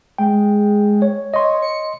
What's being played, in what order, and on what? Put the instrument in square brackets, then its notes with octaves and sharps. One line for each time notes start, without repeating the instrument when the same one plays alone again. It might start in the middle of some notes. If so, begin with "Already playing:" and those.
[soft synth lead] G#3 [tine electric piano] G5
[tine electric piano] C#5
[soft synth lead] C#5 [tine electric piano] D#5 C6
[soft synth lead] C#7